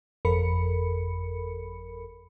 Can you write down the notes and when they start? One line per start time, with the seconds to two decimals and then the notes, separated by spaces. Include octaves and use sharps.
0.25 G1 F2 A4 A#4 B5 C#7